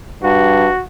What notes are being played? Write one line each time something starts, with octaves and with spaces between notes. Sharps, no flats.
G2 F#4